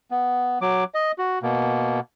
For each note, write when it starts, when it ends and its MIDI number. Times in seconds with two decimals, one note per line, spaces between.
0.11 0.59 59
0.61 0.84 54
0.61 0.84 86
0.94 1.12 75
1.18 1.39 66
1.43 2.00 47
1.43 2.00 58